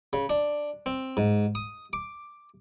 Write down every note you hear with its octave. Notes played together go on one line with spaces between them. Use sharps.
C#3
D4
C4
G#2
D#6
D6